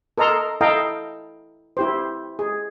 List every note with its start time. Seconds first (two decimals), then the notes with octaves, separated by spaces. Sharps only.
0.18 A4 A#4 D#5 A#5 C6
0.61 E4 A4 D#5 F5 G5 A#5
1.77 E4 G4 C5
2.39 G#4